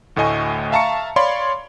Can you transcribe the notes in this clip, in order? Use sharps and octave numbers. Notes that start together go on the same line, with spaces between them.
D2 A2 A3 D#5 G#5 C#6
E5 F5 A5 A#5 C#6 C#7
C#5 D5 F5 B5 C6